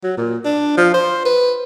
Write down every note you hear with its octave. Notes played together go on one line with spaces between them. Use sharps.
F#3
A#2
D4
F3
C5
B4